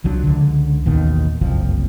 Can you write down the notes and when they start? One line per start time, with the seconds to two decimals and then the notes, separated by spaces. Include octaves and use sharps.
0.04 C2 F3 F#3 D4
0.24 C#2 D3
0.85 A1 D#2 B2 D#3
1.41 F#1 C2 F2 F3